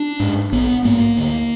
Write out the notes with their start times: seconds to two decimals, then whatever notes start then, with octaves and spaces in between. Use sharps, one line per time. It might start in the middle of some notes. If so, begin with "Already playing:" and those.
Already playing: D4
0.20 G#2
0.52 A#1 B3
0.85 G#2 A#3
1.17 D2